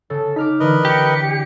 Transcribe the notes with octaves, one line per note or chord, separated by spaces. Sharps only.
C#3 A4
D#4 D6 F6 B6
D3 E3 A#4 B4 D#5
G4 C#7